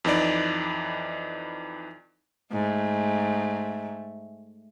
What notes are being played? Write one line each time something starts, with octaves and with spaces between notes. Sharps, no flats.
F2 E3 D#4 D5
G#2 A3